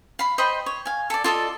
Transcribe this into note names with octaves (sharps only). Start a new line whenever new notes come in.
F5 B5
C5 D#5 G5 B5
C#5
F5 G#5
A4 D5
F4 A4 D5 D#5